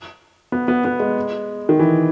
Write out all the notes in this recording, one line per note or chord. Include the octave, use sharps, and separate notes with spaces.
B3
B3
B3
G#3
D#3
E3